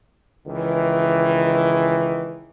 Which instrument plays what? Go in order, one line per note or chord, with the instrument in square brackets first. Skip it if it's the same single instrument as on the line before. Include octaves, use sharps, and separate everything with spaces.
[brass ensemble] C#2 D#3 E3